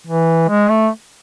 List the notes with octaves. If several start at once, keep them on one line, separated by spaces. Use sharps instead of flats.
E3
G#3
A3